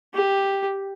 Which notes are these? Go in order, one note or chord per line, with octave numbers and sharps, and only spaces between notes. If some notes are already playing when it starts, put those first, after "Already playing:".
G4